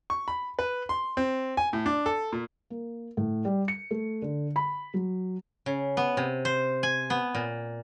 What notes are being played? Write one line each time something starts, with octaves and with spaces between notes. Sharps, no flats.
C#6
B5
B4
C6
C4
G#5
A2
D4
A4
A#2
A#3
A2
G3
C#7
A3
D3
B5
F#3
C#3
B3
C3
C5
G#5
B3
A#2